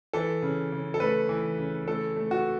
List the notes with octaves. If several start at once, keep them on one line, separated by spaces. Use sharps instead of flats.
E3 A4
C#3
C#3
A4
A3 B4
E3
C#3
A3 A4
A3
F#4